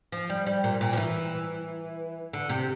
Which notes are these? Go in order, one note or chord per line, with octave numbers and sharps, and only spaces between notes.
F3
G3
G3
A#2
A#2
F3
E3
D3
C3